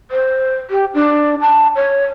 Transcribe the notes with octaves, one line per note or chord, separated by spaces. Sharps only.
C5
G4
D4
A5
C#5